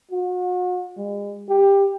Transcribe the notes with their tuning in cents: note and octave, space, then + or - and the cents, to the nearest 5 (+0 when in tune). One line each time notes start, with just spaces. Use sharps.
F#4 -40
G#3 -40
G4 +15